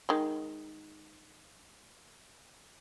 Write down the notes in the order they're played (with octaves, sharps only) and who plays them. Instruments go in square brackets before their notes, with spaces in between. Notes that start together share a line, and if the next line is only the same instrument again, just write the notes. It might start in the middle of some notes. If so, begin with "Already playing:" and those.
[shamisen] D#3 G#3